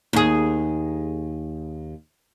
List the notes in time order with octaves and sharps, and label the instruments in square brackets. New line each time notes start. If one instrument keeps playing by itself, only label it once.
[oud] D#2 G#4